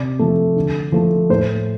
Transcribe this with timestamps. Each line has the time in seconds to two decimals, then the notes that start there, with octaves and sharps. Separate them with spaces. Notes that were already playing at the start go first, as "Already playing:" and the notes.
Already playing: C3 D5
0.19 F3 A3
0.56 D3
0.92 F3 A3
1.30 A2 C5